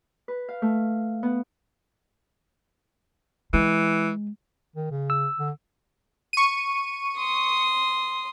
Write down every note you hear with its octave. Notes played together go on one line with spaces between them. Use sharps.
B4
F5
A3
B3
E3 G#3
D#3
C#3
E6
D3
C#6 D#7
C6 D#6